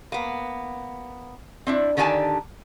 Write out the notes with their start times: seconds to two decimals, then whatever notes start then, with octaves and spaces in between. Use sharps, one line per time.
0.12 A#3 B3
1.67 C4 D4 E4
1.97 D3 D#3 D4 G4 G#5 A5